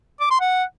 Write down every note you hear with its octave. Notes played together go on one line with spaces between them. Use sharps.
D6
C6
F#5